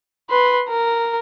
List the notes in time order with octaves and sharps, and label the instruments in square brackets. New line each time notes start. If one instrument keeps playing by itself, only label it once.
[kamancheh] B4 C6
A#4